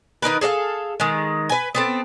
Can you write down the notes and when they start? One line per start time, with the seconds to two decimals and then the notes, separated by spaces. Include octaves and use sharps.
0.22 D#3 D#4 A#4 B4
0.41 G#4 A4 D5 F5
1.00 D#3 G#3
1.49 B4 G#5
1.75 B3 C4 A4